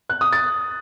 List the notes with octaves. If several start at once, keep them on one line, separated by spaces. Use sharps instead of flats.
F#6
D#6
A6